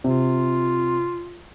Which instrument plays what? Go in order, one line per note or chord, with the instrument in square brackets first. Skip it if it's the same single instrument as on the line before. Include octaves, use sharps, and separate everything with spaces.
[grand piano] C3 [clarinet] F4